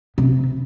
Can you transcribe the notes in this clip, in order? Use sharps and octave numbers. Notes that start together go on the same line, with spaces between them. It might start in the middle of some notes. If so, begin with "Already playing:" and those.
C3